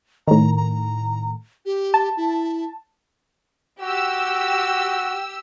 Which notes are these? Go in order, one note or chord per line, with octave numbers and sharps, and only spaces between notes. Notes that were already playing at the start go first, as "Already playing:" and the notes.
A2 D#3 A#5
A#5
G4
A5
E4
F#4 G4 E6